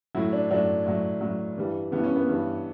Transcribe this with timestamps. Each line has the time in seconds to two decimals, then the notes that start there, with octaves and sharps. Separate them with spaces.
0.15 A2 F#3 E4
0.33 D4
0.50 A2 F#3 D4
0.86 A2 F#3
1.21 A2 F#3
1.57 G2 E3 G3
1.92 G2 E3 G3 B3
2.04 C#4
2.16 B3
2.27 G2 E3 G3